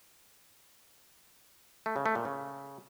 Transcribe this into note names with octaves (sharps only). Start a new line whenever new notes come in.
A3
C#3
A3
A#2
C#3